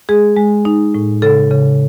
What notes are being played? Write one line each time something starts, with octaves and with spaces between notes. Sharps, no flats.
G#3 G#4
G#3
D#4
A2
C#3 A4
C#3